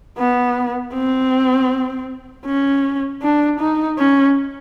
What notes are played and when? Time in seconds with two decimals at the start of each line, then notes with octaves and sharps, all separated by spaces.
0.18 B3
0.94 C4
2.46 C#4
3.22 D4
3.60 D#4
3.98 C#4